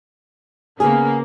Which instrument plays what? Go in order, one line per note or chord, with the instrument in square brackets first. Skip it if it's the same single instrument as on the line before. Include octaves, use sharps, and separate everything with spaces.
[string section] C#3 A#3 [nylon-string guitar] B3 G#4